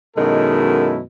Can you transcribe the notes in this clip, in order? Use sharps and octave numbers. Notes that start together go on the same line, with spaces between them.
F#2 B2 D#3 G#3 E4 A4